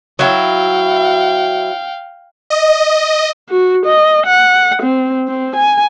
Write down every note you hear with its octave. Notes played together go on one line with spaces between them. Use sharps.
F#3 E4 F5 G5
D#5
F#4
D#5
F#5
C4
C4
G#5